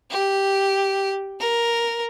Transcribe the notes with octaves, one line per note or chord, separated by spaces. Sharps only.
G4
A#4